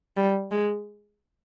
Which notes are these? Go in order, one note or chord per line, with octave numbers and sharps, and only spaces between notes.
G3
G#3